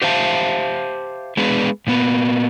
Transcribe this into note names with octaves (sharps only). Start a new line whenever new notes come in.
G4 C5 E5 F5 A5
G#3 B3 D4 G#4 B4
A#2 A#3 B3